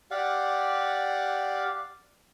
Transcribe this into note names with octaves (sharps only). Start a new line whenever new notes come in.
G4 D5 F5 F#5